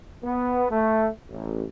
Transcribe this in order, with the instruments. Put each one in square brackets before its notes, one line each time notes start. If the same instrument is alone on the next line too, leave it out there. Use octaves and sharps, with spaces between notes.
[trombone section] B3
A3
A1